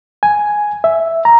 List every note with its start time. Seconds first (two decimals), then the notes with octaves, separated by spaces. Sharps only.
0.23 G#5
0.84 E5
1.25 A#5